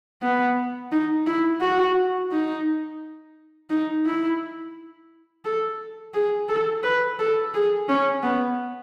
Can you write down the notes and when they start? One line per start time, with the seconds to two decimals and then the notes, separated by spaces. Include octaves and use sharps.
0.22 B3
0.92 D#4
1.27 E4
1.61 F#4
2.31 D#4
3.70 D#4
4.05 E4
5.45 A4
6.14 G#4
6.49 A4
6.83 B4
7.19 A4
7.54 G#4
7.89 C#4
8.23 B3